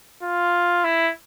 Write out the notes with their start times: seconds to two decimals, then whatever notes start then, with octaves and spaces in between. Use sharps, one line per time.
0.23 F4
0.84 E4